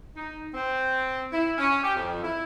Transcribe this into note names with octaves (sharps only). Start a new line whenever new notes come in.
D#4
C4
E4
C#4
G4
F2
E4